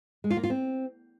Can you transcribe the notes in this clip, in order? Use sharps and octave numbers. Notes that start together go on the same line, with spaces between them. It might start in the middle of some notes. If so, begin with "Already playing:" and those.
G#3
F4
A#3
F4
C4